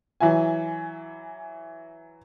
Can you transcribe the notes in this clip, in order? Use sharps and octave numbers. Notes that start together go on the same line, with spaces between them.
E3 F#3 E4 G#5